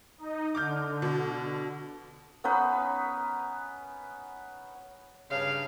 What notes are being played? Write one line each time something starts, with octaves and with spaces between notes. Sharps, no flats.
D#4 D#5
D3 D6 F6 G6
B2
B3 C#4 D#4 B4
G2 C#3 F5